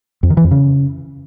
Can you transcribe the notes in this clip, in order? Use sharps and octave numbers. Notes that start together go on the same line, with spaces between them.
F2
D#3
E3
F2
C#3